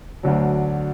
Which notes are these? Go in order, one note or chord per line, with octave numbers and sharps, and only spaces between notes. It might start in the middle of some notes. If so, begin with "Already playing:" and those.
D2 D3 F#3